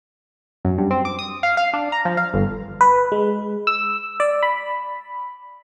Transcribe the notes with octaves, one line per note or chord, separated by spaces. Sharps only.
F#2
G2
C4
D6
D#6
F5
F5
D4
A#5
F3
F5
G1
B4
G#3
E6
D5
B5